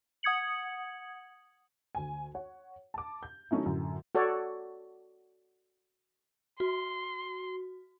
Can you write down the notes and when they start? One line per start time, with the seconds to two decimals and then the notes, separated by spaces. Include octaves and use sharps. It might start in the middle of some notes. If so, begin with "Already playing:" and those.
0.23 F#5 D#6 G#6 C#7 F#7
1.95 D2 G#5
2.35 C#5 F#5
2.94 A5 D6
3.23 G6
3.51 D#3 F#3 A3 C#4 D#4 E4
3.66 F#2 A2 D3
4.15 F#4 A4 C#5 D5
6.60 F#4 C6